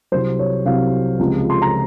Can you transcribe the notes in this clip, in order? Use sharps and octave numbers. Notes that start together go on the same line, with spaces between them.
C2 C3 F#3 C5
C#5
C2 C3 F#3 F5
C#2 C3 F3 G#3
C6
A#5